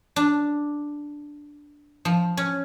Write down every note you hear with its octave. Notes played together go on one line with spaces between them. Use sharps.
D4
F3
C#4